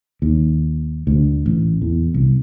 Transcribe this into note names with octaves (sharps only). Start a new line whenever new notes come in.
D#2
D2
A1
E2
C2